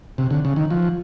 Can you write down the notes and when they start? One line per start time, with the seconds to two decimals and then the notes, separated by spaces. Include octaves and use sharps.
0.18 C3
0.31 D3
0.45 C#3
0.56 D#3
0.70 F3